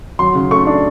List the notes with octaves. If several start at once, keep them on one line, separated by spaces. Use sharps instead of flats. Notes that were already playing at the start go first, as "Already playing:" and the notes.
F#3 C6
C#3
A3 C#6
D4